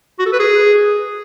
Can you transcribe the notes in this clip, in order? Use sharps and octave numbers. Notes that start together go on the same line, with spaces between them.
F#4
A4
B4
G#4